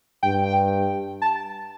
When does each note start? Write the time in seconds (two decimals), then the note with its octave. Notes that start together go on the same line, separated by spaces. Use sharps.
0.23 G2 G5
1.22 A5